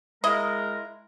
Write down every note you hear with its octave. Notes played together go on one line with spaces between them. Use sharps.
G#3 E4 A#4 D#5 F5